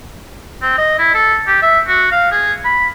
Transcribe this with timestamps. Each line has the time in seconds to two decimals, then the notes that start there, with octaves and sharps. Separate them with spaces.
0.62 C4
0.78 D#5
0.99 E4
1.14 A4
1.47 G4
1.62 E5
1.88 F#4
2.11 F5
2.31 G#4
2.64 B5